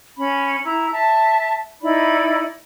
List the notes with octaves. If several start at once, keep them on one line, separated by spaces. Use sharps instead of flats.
C#4 B5
E4 A#5
E5 A5
D#4 E4 D5 B5